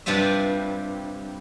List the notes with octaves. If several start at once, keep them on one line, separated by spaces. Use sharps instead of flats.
G2 C3 G3 F4 E5